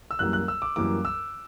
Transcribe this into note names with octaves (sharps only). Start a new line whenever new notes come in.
E6
F#2 E3 G3 A#3 F#6
F#6
E6
D6
F#2 E3 G3 A#3 D6
E6